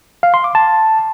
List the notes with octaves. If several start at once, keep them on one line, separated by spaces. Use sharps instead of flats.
F5
C6
D6
A5